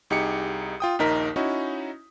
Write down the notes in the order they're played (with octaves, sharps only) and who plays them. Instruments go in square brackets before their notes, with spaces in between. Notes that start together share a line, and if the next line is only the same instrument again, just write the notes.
[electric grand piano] C2 D#4 G4 G#4 C#7
F4 G5 D#6
A#1 D#2 D#4 A#4 B6
C#4 D#4 E4 F#4